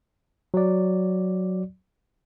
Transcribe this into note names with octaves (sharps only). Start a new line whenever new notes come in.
F#3 D5